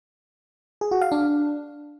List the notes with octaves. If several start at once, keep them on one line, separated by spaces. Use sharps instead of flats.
G#4
F#4
F5
D4